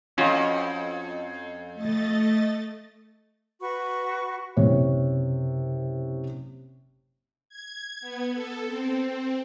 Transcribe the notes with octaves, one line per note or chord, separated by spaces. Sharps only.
F2 C#4 F4 F#4
A3 D#5 A6
F#4 B4 B5 C#6
F#1 C3 C#5
G#6
B3
A4
C4